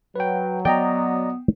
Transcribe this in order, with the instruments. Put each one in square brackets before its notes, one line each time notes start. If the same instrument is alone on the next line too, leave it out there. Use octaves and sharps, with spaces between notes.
[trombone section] F#3 [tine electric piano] B4 G5
[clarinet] B3 [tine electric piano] D5 D#5 A#5 [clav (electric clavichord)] G5